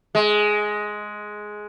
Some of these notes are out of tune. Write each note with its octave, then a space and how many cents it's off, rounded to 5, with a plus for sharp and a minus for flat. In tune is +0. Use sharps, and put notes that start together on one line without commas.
G#3 +10